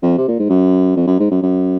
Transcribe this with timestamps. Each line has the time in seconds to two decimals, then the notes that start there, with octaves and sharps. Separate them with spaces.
0.02 F2
0.18 C3
0.28 A#2
0.39 G#2
0.49 F#2
0.96 F2
1.07 F#2
1.19 G#2
1.31 F#2
1.42 F#2